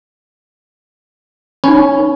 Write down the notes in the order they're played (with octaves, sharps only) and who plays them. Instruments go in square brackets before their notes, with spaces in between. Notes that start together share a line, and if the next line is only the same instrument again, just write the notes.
[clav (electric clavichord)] C#4 [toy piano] D#4 B5